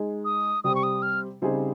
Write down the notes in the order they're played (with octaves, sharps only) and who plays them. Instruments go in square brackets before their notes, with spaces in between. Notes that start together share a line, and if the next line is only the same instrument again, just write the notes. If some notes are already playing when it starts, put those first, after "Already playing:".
Already playing: [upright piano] G#3 D#4 G#4
[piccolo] D#6
[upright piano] C3 G3 C4 G4 [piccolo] D#6
[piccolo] C#6
D#6
F6
[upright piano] C#3 G3 C4 D#4 G#4